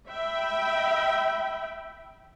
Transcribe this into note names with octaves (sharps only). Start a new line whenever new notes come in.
E5 G5 B5